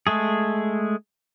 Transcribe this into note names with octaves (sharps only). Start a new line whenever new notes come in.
G#3 A3 G#4